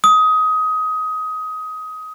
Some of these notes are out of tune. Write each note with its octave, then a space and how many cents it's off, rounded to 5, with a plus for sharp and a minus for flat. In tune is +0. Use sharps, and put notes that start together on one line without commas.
D#6 +20